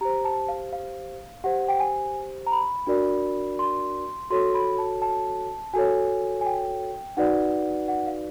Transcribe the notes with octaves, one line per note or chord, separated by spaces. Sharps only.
G4 C5 A#5
A5
F5
F5
G4 C5 F#5
G5
G#5
A#5
B5
D4 F#4 A#4 D5
C6
F#4 A4 C#5 C6
B5
A5
A5
F#4 A4 C#5 G#5
G#5
G5
D#4 F#4 B4 D5 F#5
F#5
F5